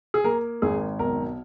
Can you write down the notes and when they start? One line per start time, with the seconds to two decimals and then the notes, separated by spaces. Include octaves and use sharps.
0.14 G#4
0.24 A#3 A#4
0.62 G#1 G#4
0.99 B1 A#4